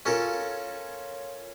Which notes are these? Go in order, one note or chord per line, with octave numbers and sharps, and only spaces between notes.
C#4 F4 A4 A#4 C#5